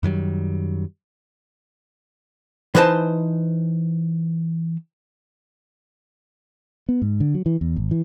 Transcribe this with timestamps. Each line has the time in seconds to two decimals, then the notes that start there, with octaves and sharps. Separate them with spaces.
0.03 F#2 D#3 F#3 G3
2.75 E3 D#4 B4 C5 A5
6.89 B3
7.02 G#2
7.20 D3
7.34 F#3
7.46 E3
7.61 E2
7.76 G#1
7.91 E3